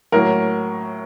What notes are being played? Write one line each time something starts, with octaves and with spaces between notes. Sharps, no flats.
A2 F#3 A#3 A#4